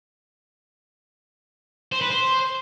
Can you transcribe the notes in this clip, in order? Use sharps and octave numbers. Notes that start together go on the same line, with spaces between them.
C5
B4
C5